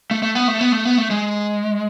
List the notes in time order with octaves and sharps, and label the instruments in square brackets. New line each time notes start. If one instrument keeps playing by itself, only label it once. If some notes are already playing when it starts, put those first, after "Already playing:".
[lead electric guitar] A3
A3
B3
A3
B3
A3
B3
A3
G#3